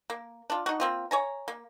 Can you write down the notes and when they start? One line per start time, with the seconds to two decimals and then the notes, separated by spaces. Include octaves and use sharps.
0.10 A#3
0.50 D4 F4
0.66 D#4 F#4
0.80 A#3 C4 F4
1.11 C#5 G#5 A#5
1.48 A#3